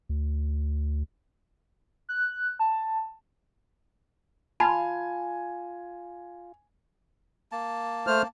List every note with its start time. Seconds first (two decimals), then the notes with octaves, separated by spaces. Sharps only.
0.09 D2
2.09 F#6
2.59 A5
4.60 F4 G#5 A5 B5
7.52 A#3 A5
8.07 A3 C5 F6